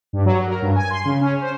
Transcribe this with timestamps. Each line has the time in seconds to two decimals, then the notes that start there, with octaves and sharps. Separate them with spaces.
0.13 G2
0.25 F#3
0.47 A#4
0.62 G2
0.75 G#5
0.90 C6
1.05 C#3
1.21 C#4
1.41 C5